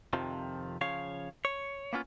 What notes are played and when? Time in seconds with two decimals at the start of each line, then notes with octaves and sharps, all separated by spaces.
0.13 F2 C3 D#3 F3
0.81 C#3 F3 C#5 F5
1.45 C#5
1.93 A#3 B3 C#4 F4